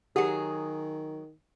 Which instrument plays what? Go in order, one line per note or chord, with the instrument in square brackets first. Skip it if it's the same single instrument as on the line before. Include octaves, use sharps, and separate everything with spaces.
[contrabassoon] D#3 [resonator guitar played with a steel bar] F#3 G#4 [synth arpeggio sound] G4 F#5